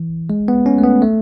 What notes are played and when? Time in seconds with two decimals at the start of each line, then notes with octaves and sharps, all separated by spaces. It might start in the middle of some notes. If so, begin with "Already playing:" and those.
Already playing: E3
0.30 G#3
0.48 B3
0.66 C#4
0.78 A3
0.84 B3
1.02 A3